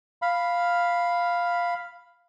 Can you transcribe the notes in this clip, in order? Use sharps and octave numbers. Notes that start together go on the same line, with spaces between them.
F5 B5